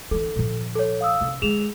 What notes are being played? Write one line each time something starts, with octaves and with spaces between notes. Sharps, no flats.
E3 D#4 A4
A#2 F3
A4 C#5
F5 D#6 E6
C3 C#4
F3 G#3 G#4 E7 F7